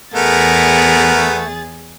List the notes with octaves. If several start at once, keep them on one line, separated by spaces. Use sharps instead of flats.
E2 A3 B3 G#4 A#4 A6